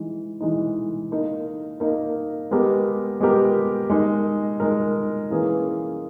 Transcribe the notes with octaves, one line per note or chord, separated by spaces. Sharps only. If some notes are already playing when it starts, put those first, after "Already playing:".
Already playing: E3 G#3 D#4
E3 G#3 D#4
A#3 D#4 A#4
A#3 D#4 A#4
G#3 B3 G4 A#4
G#3 B3 G4 A#4
G#3 D#4 A#4
G#3 D#4 A#4
E3 A#3 C#4 G#4 B4